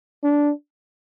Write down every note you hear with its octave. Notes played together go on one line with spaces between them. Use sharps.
D4